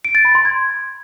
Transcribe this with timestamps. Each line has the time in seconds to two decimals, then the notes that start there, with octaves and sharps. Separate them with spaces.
0.05 D7
0.15 A6
0.25 B5
0.35 C6
0.45 G#6